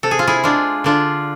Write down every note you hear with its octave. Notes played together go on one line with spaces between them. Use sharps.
C3 A4
G#4
F4
E4 G#4
G#3 D4 F4
D3 D4 F4